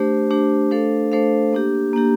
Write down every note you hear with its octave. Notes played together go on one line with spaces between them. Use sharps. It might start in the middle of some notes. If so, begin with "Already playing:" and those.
Already playing: A3 D4 G4 C5
A3 D4 G4 C5
A3 D4 A4 C5 F5
A3 D4 A4 C5 F5
A#3 D4 G4
A#3 D4 G4